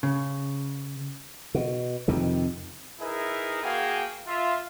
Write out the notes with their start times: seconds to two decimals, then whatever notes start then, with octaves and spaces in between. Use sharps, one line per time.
0.03 C#3
1.55 B2
2.08 F2 C3 D#3
3.00 D#4 E4 G#4 A#4 B4 E5
3.63 A#3 F#4 G#4 F5 G5 G#5
4.26 F4 E5